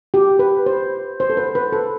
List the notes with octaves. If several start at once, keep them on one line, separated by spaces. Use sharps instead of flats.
G4
B4
C5
C5
A4
B4
B4
A4